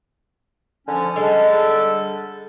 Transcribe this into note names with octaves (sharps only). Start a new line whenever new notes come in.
D3 F3 C#4
D3 G3 G#3 A4